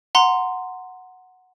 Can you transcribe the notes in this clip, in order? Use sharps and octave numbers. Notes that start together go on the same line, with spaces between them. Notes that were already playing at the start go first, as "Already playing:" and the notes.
F#5 A#5 C6